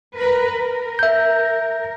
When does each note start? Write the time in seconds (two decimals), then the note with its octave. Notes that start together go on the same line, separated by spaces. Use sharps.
0.17 A#4 B4
0.51 A#4
0.99 E5 G6